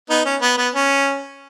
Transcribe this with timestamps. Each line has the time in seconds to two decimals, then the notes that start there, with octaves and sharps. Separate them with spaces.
0.10 B3 D#4
0.25 C#4
0.42 B3
0.58 B3
0.74 C#4